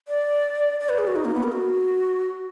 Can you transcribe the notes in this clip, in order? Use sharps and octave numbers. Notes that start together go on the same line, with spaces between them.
D5
D5
B4
G#4
F#4
D#4
A#3
B3
A#4
F#4